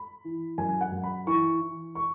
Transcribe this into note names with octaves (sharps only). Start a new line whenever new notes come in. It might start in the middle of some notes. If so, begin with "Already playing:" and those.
Already playing: B5
E3
F#2 G#5
F#5
F#2
B5
E3 C#6
E3
C#6